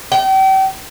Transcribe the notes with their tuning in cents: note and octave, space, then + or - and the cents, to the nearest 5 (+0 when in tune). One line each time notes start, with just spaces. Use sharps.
G5 -35